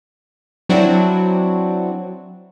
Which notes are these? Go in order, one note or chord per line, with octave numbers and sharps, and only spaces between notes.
F#3 C4 D4 E4 F#4